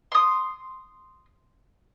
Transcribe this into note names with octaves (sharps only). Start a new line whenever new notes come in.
C6 D#6